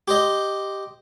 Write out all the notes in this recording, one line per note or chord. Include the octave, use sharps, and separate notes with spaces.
G4 C5 D#5